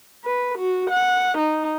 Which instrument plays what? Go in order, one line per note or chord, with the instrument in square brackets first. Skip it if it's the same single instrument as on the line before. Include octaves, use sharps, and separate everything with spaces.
[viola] B4
F#4
F#5
D#4